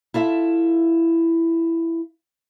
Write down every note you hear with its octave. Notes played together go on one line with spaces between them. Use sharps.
E4 F4 A4 E5